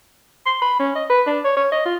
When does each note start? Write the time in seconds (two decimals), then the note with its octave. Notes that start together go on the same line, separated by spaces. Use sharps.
0.46 C6
0.62 B5
0.79 C#4
0.95 D#5
1.09 B4
1.26 D4
1.44 C#5
1.56 C#5
1.72 D#5
1.86 F4